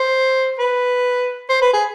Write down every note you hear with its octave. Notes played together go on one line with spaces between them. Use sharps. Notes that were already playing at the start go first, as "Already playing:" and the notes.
Already playing: C5
B4
C5
B4
G#4